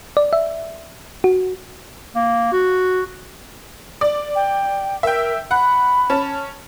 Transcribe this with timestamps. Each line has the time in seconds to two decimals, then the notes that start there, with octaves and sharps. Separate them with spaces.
0.17 D5
0.33 E5
1.24 F#4
2.16 A#3
2.52 F#4
4.01 D5
4.35 G5
5.03 A#4 E5 G5
5.51 F#5 B5
6.10 C#4 A5